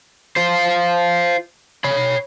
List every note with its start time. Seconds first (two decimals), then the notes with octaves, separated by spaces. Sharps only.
0.36 F4 C5
1.84 C#5 B5